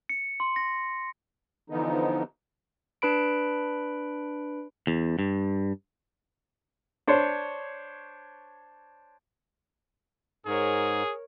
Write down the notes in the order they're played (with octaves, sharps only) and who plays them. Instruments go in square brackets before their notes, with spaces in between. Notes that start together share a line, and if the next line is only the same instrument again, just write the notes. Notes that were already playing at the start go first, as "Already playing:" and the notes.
[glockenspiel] C#7
C6
A#6
[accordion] D3 E3 F3 B3 D#4
[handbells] D4 B4 B5 D7
[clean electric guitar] E2
G2
[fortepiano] D4 C5 C#5
[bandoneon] G#2 [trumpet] G#4 [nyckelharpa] A#4 C#5